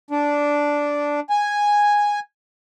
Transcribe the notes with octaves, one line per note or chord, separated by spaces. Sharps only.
D4
G#5